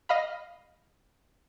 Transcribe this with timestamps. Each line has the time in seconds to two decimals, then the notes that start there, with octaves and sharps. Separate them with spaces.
0.09 D#5 F5 B5